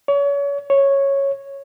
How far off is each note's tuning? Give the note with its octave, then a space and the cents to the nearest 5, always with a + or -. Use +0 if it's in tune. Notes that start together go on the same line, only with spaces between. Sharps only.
C#5 +35
C#5 -5